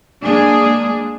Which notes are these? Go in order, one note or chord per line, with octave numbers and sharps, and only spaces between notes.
G#3 A#3 D4 G#4